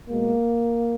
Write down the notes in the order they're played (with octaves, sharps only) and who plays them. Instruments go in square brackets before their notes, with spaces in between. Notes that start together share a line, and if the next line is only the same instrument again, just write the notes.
[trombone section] B2 G#3 A#3